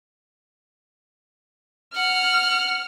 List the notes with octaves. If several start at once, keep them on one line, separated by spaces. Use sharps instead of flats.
F#5 F6